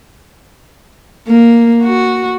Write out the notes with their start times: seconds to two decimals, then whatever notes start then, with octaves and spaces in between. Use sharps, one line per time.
1.28 A#3
1.83 F#4